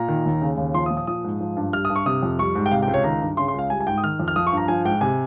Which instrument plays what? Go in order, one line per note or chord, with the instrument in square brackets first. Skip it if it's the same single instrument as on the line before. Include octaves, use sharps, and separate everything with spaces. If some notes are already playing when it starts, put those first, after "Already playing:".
Already playing: [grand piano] A#2 A#5
D#3
D#2
C#3
D#2
F3 C6
D#6
A#2
D#6
F3 D#6
G#2
F3
G2
G3 F6
D#6
G2
C#6
C3 D#6
F2
G3 C#6
G#2
G5
C3 F5
G5
C#2
C#5
D#3 A#5
G2
C#3 C6
C6
C#2 F5
G3 G#5
G#5
G#2 G5
D#6
D#3 F6
F2
F6
F3 D#6
C#6
G2 A#5
F3 G#5
G#2 G5
C3 G#5